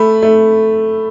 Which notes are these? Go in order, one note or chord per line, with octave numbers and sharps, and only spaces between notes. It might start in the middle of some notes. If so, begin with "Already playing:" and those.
Already playing: A3 B5
A3